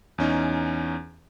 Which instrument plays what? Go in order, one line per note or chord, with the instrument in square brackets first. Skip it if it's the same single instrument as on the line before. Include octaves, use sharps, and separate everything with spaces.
[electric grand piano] E2 C#4 D#4